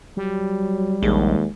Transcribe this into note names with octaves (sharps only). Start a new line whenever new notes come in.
F#3 G3
A#1 D#2 G#3